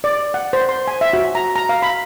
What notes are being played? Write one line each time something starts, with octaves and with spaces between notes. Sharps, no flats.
D5
F#5
C5
C6
G#5
E5
F#4
A#5
A#5
F5
B5